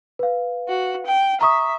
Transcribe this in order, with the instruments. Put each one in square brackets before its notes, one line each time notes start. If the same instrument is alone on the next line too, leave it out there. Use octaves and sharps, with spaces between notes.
[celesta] B4 F5
[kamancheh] F#4
G5
[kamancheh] E5 [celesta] A#5 C#6 D#6